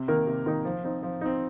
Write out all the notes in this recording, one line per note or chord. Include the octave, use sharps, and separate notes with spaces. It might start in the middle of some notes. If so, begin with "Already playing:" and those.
Already playing: C3
D#3 A#3 D#4 A#4
C3
D#3 A#3 D#4 A#4
F3
C4 D#4
F3
C4 D#4